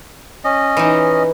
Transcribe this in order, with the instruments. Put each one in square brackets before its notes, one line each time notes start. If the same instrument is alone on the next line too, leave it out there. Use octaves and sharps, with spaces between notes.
[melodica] C#4 D#5
[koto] E3 D#4